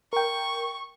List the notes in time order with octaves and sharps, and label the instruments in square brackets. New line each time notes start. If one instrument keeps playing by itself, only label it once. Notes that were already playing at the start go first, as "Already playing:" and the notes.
[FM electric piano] A#4 G5 [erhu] C#6